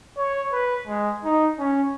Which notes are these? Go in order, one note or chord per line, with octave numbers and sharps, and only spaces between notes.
C#5
B4
G#3
D#4
C#4